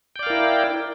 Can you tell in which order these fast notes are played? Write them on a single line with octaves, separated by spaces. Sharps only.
G5 D5 F5 A#4 E4